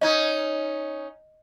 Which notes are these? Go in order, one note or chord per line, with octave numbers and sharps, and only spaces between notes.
C#4 D#4 D#5 G#6